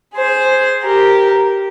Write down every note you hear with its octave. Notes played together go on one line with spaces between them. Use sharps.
G#4 C5
G4 A#4